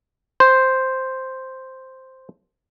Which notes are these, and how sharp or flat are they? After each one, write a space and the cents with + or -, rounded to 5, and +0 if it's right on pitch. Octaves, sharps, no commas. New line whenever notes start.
C5 +0